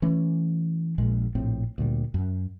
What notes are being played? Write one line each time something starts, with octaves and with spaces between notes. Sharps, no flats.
E3 A3 C#4
A#1 A#2 G#3
A#1 A2 C4
D2 A#2 G3
F#2